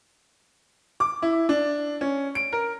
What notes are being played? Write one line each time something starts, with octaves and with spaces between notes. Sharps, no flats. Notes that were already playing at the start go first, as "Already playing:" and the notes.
D6
E4
D4
C#4
D7
A#4